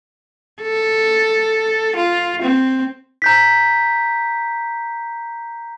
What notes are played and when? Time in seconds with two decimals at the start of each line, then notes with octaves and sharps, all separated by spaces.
0.62 A4
1.96 F4
2.42 C4
3.22 A#5 G6 B6